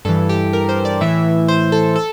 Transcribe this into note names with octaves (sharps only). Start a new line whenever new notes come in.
G2 E3 A4
G4
A#4
C5
D5
A2 E3 E5
C5
A4
A4